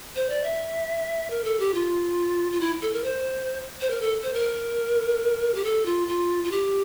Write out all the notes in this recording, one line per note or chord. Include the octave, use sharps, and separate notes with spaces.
C5
D5
E5
A#4
A4
G4
F4
F4
E4
A4
A#4
C5
C5
A#4
A4
C5
A#4
G4
A4
F4
F4
F4
G4